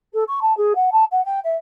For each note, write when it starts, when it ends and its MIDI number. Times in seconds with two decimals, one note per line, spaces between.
0.13 0.23 69
0.28 0.39 85
0.41 0.55 81
0.57 0.73 68
0.75 0.89 78
0.92 1.04 81
1.11 1.23 78
1.25 1.39 79
1.44 1.55 76